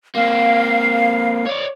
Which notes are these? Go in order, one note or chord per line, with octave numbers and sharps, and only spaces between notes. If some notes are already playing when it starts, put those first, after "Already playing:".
A#3 C4 F5
C#5 D5